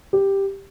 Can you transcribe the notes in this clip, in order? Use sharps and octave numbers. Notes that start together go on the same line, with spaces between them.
G4